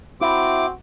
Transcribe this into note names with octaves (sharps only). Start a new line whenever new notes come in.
C4 E4 F#4 D6